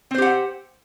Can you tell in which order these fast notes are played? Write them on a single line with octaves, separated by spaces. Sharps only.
C4 C5 G4 F#5